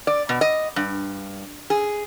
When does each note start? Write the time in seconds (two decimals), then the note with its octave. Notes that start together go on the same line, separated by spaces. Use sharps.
0.07 D5
0.29 B2
0.41 D#5
0.76 G2
1.70 G#4